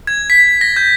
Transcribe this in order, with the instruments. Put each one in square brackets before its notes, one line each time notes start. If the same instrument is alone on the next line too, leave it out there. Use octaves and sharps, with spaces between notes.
[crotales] G#6
B6
A#6
G6